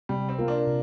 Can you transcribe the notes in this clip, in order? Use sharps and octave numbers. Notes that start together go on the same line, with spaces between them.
C3 G3
C4
A#3 F4 A#4
D4
C3